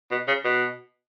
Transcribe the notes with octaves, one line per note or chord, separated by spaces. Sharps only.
B2
C#3
B2